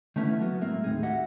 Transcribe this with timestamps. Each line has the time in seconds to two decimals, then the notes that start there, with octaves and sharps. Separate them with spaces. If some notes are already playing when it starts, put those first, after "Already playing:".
0.16 D#3 A3 B3 C#4 E4
0.40 F#3 A#3 B3 F#4
0.61 A2 G#3 A#3 C4 A#4 E5
0.84 D#2 A2 C3 C4 D#4 G#4
1.03 F#4 G4 D#5 E5 F#5